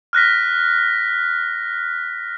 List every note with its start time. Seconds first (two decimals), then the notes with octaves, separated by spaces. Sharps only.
0.13 F6 F#6 A#6 B6